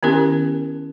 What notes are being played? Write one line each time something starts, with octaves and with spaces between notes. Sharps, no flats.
D#3 B3 C#4 E4 G4 A#4